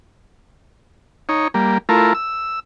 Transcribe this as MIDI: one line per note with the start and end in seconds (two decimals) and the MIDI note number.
1.29 1.48 63
1.29 1.48 73
1.54 1.78 55
1.54 1.78 58
1.89 2.13 57
1.89 2.13 64
1.89 2.13 65
1.89 2.13 70
2.15 2.60 88